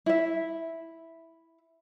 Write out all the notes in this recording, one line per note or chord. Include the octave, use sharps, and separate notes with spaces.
E4 E5